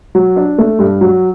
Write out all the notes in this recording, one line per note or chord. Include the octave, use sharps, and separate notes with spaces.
F#3
D4
A3
G2
F#3